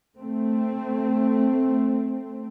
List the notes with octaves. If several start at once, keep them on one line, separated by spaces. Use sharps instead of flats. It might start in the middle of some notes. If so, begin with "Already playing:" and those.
A3 C4